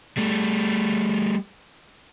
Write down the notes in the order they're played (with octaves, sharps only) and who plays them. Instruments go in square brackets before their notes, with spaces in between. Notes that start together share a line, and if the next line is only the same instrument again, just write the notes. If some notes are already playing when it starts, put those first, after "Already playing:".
[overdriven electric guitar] G3 A3